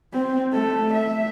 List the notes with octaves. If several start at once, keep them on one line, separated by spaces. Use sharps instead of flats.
C4
A3 A4
E5